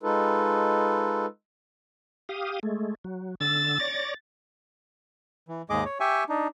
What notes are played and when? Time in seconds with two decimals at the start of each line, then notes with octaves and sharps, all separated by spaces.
0.03 G#3 D#4 F4 A4 B4
2.29 G4 F5 D#6
2.63 G#3 A3
3.04 F#3
3.41 D3 E6 A6
3.80 C#5 D5 A#6
5.48 E3
5.70 D#2 G#2 G#3 G#4 D#5 D6
5.85 C#5
6.00 G4 E5 G5 G#5 C#6
6.29 D4 D#4